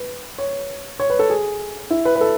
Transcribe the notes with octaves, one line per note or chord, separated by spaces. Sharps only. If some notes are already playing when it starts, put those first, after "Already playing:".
Already playing: B4
C#5
C#5
B4
A4
G#4
E4
B4
B4
A4